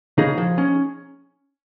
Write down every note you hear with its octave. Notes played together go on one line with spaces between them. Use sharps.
C#3 D#4 G#4
F3
C#4